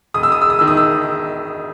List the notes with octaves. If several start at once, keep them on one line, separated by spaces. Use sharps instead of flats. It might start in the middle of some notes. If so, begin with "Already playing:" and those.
E1 D#6
E6
D#6
E6
D#6
D#3 E6
D#6
E6